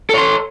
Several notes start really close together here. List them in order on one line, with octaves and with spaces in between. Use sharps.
A4 C#5 C6